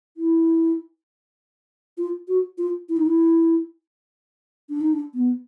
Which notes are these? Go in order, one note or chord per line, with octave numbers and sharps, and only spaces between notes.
E4
F4
F#4
F4
E4
D#4
E4
D4
D#4
D4
B3